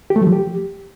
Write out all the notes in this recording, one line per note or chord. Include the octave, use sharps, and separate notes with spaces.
G4
A3
F#3
F3
G4